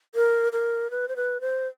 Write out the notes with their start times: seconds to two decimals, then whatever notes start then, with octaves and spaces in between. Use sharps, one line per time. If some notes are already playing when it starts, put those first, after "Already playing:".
0.15 A#4
0.53 A#4
0.91 B4
1.08 C5
1.16 B4
1.41 C5